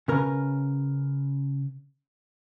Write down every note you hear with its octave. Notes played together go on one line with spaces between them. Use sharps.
C#3 C#4 A#4 B4